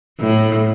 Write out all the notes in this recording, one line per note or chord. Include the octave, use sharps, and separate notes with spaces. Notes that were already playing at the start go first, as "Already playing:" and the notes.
A2